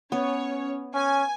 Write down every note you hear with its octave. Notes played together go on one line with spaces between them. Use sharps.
B3 C#4 C#5
C#4 G#5